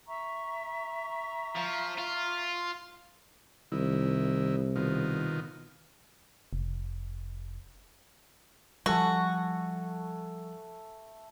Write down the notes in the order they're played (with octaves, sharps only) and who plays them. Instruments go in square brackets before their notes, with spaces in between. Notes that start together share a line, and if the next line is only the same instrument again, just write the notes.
[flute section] E5 A#5 C#6
[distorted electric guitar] F3
F4
[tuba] C2 [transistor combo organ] D#3 E4
[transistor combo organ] B2 D#3 F4
[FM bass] F1
[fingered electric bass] F3 G3 [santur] A3 A4 G#5 [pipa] F#4